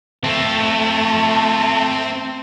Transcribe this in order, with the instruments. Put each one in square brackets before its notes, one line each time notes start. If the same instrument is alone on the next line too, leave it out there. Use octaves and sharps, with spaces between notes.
[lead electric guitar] A3 [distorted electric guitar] C4 A4